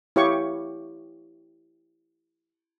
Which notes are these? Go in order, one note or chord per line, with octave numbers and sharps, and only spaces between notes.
E4 G4 C#5 F5 C#6